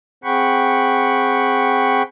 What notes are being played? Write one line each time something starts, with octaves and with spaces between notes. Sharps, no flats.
C4 G#4 F#5 G5 B5 C#6